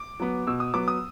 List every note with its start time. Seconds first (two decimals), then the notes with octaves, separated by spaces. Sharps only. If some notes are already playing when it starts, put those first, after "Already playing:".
Already playing: D6
0.20 F#3 B3
0.47 B2 E6
0.60 D#6
0.74 F#3 B3 D6
0.88 D#6